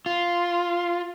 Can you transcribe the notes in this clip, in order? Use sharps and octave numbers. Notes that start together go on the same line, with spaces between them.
F4